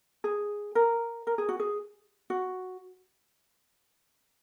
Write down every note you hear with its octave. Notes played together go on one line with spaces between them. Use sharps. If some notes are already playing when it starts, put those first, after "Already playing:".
G#4
A#4
A#4
G#4
F#4
G#4
F#4